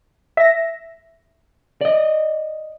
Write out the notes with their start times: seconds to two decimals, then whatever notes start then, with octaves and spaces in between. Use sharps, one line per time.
0.37 E5 A#6
1.81 D5 D#5